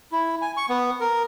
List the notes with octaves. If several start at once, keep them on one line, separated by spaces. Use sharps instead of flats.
E4
G#5
C#6
B3
A#4